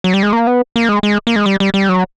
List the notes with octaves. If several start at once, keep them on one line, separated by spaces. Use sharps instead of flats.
F#3
G3
G#3
A#3
B3
A#3
G#3
G#3
A#3
G#3
G3
G3
G3
F#3